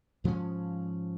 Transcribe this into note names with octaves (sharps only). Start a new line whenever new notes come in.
G#2 F3 G#3 C#4